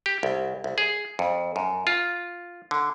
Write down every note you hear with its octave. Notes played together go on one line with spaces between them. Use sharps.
G4
C2
C2
G#4
F2
F#2
F4
D3